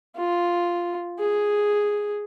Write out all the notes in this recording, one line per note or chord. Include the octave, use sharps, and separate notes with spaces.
F4
G#4